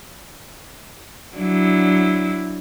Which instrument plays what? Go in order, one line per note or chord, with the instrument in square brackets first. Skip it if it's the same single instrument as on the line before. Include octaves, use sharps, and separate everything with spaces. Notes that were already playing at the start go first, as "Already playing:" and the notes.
[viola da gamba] F#3 D4 E4